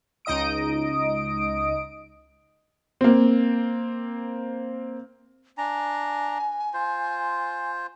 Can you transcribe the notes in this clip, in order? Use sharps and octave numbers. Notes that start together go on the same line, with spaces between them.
C#2 D#4 D#5 D#6 D7
A#3 C4
D4 G#5 A#5
F4 C5